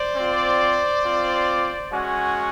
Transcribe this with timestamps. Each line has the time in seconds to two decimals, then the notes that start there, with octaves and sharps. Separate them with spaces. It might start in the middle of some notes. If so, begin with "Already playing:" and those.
Already playing: C5 D5
0.16 C4 F4
1.04 C4 F4
1.91 G#3 C#4 F#4 F#5 G#5